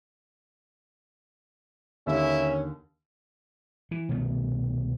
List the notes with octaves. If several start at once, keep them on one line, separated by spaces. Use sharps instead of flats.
D#2 D3 C#4 E4 E5
E3
C2 B2 D#3 A3